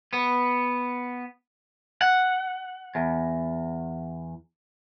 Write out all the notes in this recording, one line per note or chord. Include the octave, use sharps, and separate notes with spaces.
B3
F#5
E2